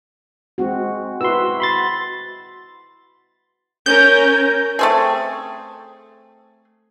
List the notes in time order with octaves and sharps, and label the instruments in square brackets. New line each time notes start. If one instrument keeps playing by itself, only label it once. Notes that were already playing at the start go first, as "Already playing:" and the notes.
[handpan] G#3 C4 F#4
[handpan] E4 F#4 B4 [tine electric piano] C6 E6
[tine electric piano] B5 C6 A6
[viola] C#4 A#4 [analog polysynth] G6
[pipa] A3 C4 G#4